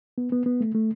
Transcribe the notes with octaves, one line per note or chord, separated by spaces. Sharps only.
B3
B3
B3
A3
A3